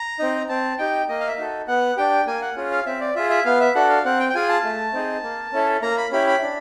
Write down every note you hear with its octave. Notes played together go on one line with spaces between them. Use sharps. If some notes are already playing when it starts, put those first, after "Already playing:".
Already playing: A#5
C4 D#4
C4 A5
D#4 G4 G5
A#3 D#5
F5
E5
D#4 F#4 A4
B3 F#5
D4 G4 G5
A#3 G#5
F#5
C#4 F4 G#4
F5
C4 E5
D5
F4 G#4 E5
E5
B3 F5
E5
D4 F#4 A4 F#5
F5
C4 F#5
G5
G5
F4 G#4 G#5
A5
A3
C4 D#4 G#4
A#3
C#4 E4 A4
A#3 A#5
B5
C#4 E4 G4 B5
B5
D4